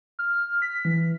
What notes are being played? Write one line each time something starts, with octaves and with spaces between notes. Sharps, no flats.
F6
B6
E3